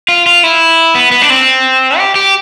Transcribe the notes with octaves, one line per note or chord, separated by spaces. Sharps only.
F4
F4
E4
B3
B3
D4
C4
G4
G4